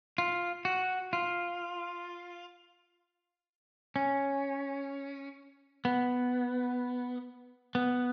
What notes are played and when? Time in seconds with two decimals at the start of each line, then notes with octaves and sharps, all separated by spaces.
0.18 F4
0.65 F#4
1.13 F4
3.96 C#4
5.85 B3
7.75 B3